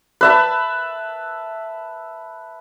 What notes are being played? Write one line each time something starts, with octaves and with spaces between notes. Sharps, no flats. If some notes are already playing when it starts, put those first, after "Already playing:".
B4 E5 A5